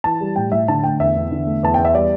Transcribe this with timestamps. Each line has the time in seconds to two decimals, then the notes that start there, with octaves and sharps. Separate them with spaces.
0.04 E3 A5
0.21 G3
0.36 A2 G5
0.52 A2 E5
0.68 D3 A5
0.84 A3 G5
1.00 E2 E5
1.16 E2
1.31 D3
1.47 A3
1.63 E2 A5
1.74 E2 G5
1.85 E5
1.95 G3 D5